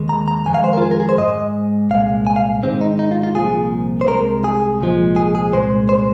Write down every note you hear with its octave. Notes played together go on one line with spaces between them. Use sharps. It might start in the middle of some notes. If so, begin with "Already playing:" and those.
Already playing: D#2 D#3 G#3
A#5
A#5
F2 D#3 G#3 G#5
F5
C5
A#4
F4
G#4
A#4
G#4
C5
G#2 G#3 D#5
C2 A#2 G#3 F5
G#5
F5
G#2 D#3 G#3 C4
D#4
D#4
F4
F4
C2 A#2 F3 G#4
C5
C2 C3 G#3 A#4
G#4
C2 A#2 F3 G#3
G#4
G#4
C2 A#2 G#3 C5
C5